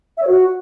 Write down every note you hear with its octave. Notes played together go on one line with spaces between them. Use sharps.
E5
C#5
F#4